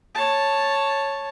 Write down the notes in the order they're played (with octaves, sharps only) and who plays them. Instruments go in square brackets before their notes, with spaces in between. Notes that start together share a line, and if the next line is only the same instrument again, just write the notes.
[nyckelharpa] C#5 A5